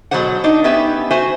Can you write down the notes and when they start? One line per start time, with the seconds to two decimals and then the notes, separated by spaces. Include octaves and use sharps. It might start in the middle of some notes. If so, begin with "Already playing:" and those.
0.11 B2 F#3 G3 G#4 C5 F#5
0.44 D4 D#4
0.64 B3 C#4 G4 B4 E5
1.11 F#4 C5 E5 G#5